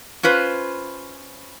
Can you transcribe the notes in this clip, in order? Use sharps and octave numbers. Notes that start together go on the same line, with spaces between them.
C#4 F4 B4 C5